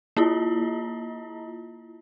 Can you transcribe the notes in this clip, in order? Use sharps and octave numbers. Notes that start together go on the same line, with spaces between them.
A#3 E4 F4